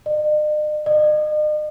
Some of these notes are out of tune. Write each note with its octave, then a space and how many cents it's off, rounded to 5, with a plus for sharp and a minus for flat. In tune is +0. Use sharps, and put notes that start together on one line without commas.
D#5 -45
D#5 -40